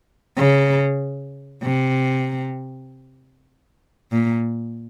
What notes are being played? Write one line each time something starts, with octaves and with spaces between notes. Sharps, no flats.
C#3
C3
A#2